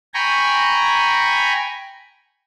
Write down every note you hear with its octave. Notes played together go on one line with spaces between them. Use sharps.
G5 G#5 A#5 B5 C#6